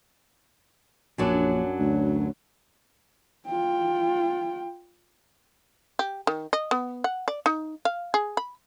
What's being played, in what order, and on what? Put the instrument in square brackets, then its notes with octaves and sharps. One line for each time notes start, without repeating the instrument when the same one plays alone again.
[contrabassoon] A#1 [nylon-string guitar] F#2 F#3 D4
[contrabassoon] D2
[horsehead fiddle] F4 G5
[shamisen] G4
D#3
D#5
B3
F#5
D5
D#4
F5
G#4
B5